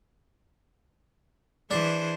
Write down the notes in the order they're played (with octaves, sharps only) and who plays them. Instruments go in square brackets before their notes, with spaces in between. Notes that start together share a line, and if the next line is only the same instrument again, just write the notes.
[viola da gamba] E3 G#4 C5 [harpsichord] D4